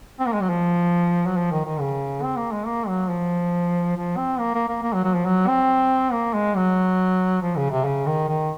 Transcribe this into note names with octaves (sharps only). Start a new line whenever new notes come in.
C4
A#3
G#3
F#3
F3
F#3
F3
D#3
D#3
C#3
C4
A#3
G#3
A#3
F#3
F3
F3
C4
A#3
A#3
A#3
A#3
F#3
F#3
F3
F#3
C4
A#3
G#3
F#3
F3
C#3
C3
C#3
D#3
D#3